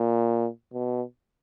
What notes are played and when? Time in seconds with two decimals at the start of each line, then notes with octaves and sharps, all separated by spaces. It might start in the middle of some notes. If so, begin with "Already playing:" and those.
Already playing: A#2
0.73 B2